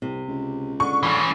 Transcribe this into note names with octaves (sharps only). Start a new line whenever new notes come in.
C2 C3
C#2
D3 C#6
E3 C#4